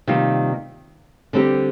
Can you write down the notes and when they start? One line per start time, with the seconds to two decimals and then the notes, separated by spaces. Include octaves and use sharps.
0.07 C3 D#3 G3 A#3 F4
1.33 D3 G3 C4 G4